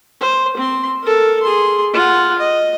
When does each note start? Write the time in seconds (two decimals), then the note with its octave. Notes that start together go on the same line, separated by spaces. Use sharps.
0.21 C5
0.57 C4 C6
1.03 A4 A#4
1.43 G#4 C6
1.94 F4 F#5
2.39 D#5